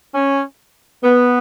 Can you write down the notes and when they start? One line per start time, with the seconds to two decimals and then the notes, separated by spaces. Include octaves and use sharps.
0.14 C#4
1.04 B3